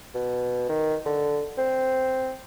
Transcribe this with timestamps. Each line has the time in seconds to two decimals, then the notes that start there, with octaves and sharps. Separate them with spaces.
0.14 B2
0.69 D#3
1.05 D3
1.58 C4